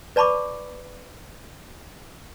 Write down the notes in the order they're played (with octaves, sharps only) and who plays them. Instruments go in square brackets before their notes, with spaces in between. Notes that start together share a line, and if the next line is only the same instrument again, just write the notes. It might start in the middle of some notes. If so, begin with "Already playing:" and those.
[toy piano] B4 D5 A5 B5 C#6 D6